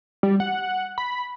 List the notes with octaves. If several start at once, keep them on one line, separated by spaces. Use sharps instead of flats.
G3
F#5
B5